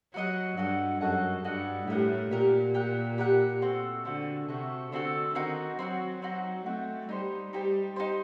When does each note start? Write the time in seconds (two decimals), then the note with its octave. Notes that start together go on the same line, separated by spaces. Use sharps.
0.14 F#3 F#4 A4 D#5 F#5
0.57 G2 F#4 A4 D#5 F#5
1.01 F#2 F#4 A4 D#5 F#5
1.45 G2 F#4 A4 D#5 F#5
1.87 A2 G4 A#4 F#5
2.31 A#2 G4 A#4 F#5
2.74 G4 A#4 F#5
3.18 G4 A#4 F#5
3.61 A3 C4 F#4 A4
4.05 D3 A3 C4 F#4 A4
4.48 C3 A3 C4 F#4 A4
4.92 D3 A3 C4 F#4 A4
5.35 D#3 C4 D#4 F#4
5.79 F#3 C4 D#4 F#4
6.22 C4 D#4 F#4
6.66 A3 C4 D#4 F#4
7.09 G3 D#4 G4 C5
7.52 G3 D#4 G4 C5
7.96 D#4 G4 C5